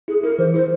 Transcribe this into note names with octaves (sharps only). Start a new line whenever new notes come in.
E4 G#4
E4 A#4
E3 C5
E4 C5